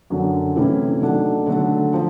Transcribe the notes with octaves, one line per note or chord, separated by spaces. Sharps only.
F#2 D3 F#3
C3 E3 A3 C#4 E4
D#3 F#3 A3 D4
D3 F#3 A3
F3